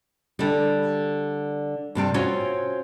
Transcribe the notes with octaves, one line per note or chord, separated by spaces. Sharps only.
D3 G3
G2 C3 G3 C4
C4 C#4 F4 F#4 C#5